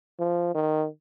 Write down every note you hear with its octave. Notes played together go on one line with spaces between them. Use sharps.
F3
D#3